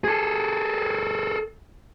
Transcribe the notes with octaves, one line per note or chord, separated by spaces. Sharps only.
G#4 A4